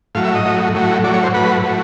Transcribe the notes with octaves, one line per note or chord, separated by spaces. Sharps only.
A2 F#3 F5
E5
D#5
A2 F#3
A2 F#3
A2 F#3 D5
C#5
C5
A2 F#3 B4
A2 F#3